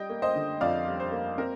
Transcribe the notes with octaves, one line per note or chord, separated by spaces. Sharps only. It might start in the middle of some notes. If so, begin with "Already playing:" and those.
Already playing: G3 D#5 G5
A#3
C5 D#5
D3
F2 D5 F5
G3
C5
A#3
C4 A#4